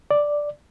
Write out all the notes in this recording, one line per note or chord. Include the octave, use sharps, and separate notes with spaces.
D5